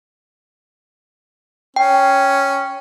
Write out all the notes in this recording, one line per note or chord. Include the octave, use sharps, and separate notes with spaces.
C#4 G5